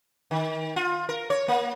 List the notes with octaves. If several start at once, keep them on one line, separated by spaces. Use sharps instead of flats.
D#3
F4
A#4
C#5
A#3